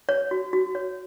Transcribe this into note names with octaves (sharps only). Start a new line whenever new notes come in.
C#5
F#4
F#4
C#5